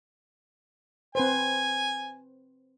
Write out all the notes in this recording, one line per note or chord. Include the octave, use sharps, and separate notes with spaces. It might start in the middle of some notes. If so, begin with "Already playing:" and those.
C4 B4 C5 G#5